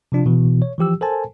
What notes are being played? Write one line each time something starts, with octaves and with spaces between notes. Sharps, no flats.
C3 F3 D4 F4
B2 E3
C#5
E3 F3 G4 E6
A4 A#4 C5 G#5 A5